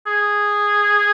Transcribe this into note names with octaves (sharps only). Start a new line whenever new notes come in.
G#4